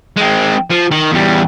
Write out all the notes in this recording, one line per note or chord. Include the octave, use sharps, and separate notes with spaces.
G#3 C4
F3
D#3
E2 G3